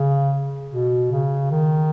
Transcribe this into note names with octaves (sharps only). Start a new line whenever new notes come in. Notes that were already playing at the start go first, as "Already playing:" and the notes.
Already playing: C#3
B2
C#3
D#3